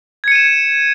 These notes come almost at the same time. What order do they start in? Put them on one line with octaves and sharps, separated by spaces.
G#6 C#7 D#7 E7